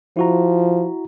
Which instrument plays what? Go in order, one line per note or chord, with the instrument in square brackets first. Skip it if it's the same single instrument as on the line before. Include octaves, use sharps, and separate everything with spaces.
[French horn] F3 [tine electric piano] E4 F#4 A#5